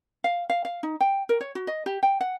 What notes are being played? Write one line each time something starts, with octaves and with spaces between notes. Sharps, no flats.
F5
F5
F5
D#4
G5
A#4
C#5
F#4
D#5
G4
G5
F#5